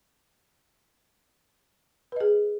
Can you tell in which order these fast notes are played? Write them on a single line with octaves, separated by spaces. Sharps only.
B4 D#5 G#4